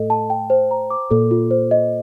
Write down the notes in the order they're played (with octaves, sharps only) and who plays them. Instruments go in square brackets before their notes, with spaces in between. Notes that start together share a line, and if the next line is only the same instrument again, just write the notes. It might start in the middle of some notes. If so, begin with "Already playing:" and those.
Already playing: [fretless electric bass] A2 [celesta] A4 D#5
[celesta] A5
G5
C5
A#5
D6
[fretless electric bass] A#2 [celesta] A4
[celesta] F4
C5
D#5